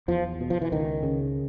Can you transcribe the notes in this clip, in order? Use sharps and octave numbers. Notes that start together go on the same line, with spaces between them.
E2 F3
B2
F3
E3
C#2 D#3
C#3